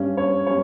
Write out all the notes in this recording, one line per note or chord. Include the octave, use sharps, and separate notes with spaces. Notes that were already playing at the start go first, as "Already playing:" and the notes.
Already playing: G2 G3 C#4
C#5
G3 C#4 C#5